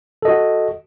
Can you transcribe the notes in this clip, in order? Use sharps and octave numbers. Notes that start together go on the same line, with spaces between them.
F#4 A4 D#5